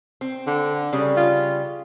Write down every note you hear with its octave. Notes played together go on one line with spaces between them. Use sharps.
C4
D3
C#3 G3
F4